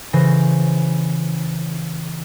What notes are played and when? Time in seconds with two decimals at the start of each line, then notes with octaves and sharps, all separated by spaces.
0.13 C#3 E3 C5 A#6